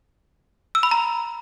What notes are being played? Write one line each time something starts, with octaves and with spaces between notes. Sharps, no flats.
E6
B5
A#5